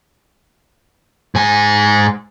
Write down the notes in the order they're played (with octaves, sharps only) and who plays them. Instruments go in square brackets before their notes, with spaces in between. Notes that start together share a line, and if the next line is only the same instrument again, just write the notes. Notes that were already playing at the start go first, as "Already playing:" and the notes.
[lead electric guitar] G#2 G#5